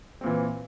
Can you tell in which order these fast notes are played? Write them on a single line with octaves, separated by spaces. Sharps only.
C4 A#2 E3